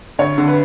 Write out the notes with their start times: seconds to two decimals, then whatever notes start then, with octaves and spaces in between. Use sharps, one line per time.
0.19 D2 C#5
0.38 D3
0.47 B4